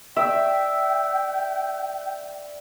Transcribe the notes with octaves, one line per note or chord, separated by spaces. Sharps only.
D5 E5 G5